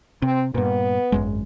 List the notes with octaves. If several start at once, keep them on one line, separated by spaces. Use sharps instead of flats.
C3 C4
G2 A#2 B3
G#1 F#2 G#3